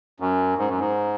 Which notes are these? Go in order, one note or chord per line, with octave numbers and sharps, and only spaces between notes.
F#2
G#2
F#2
G#2